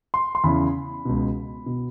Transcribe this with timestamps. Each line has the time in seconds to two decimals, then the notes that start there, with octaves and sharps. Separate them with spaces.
0.14 C6
0.35 C6
0.44 E2 C#3 E3 B5
1.05 C#2 B2
1.66 B2